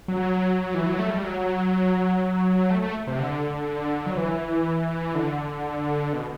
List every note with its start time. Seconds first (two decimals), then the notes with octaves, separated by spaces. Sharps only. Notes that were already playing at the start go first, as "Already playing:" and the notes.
0.08 F#3
0.74 E3
0.86 F#3
0.99 A3
1.10 G3
1.23 F#3
2.70 A3
2.82 A3
3.07 C3
3.19 D3
4.06 F#3
4.17 E3
5.15 D3
6.13 B2